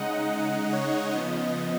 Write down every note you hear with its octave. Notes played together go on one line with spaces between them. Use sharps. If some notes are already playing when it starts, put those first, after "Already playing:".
Already playing: C#3 G#3 D#4 D#5 F#5
D#5
C#5
C#3 F3 B3 D#5